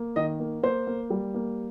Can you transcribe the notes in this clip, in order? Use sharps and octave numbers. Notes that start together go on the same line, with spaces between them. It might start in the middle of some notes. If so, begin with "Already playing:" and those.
Already playing: A#3
D#3 D#5
A#3
A#3 C5
A#3
G3
A#3